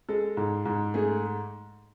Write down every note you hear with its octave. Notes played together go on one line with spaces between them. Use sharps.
G#3 A4
G#2
G#2
A3 G#4